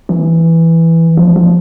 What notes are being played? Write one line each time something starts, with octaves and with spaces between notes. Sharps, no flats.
E3
F3
F3